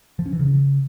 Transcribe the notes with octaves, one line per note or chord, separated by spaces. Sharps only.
F3
C#4
E3
C#3